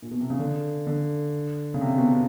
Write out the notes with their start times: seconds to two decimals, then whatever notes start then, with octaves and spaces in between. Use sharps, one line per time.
0.02 A#2
0.11 B2
0.20 C3
0.30 C#3
0.39 D3
0.87 D3
1.74 C#3
1.81 C3
1.98 B2
2.13 C3